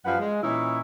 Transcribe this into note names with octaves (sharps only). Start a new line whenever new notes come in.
F#2 F3 G3 B4 F5 F#5
G#3
A#2 E3 C#4 D#4 E4